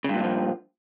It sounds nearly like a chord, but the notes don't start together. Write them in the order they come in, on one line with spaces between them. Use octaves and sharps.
C#3 G2 A#2 F#3 F3